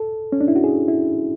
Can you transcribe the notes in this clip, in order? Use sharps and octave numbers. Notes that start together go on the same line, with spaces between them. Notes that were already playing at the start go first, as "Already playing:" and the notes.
Already playing: A4
C#4
D4
E4
F#4
G#4
E4